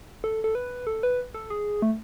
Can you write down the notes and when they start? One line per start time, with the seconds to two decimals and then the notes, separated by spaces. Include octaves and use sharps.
0.24 A4
0.44 A4
0.55 B4
0.87 A4
1.03 B4
1.34 A4
1.50 G#4
1.82 A3